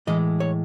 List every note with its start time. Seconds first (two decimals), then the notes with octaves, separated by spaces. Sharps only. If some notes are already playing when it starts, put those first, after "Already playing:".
0.07 A2 E3 G#3 D#5
0.40 C#5